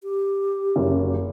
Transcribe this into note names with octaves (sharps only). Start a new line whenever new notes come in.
G4
F#1 F#2